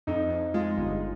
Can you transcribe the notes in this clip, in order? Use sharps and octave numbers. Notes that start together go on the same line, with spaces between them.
F2 D#4
F2
G#3 F4
G1